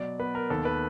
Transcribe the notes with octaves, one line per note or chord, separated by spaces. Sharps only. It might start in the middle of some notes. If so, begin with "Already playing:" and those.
Already playing: B2 F#3 D5
B3 B4
A#4
D#2 A4
B4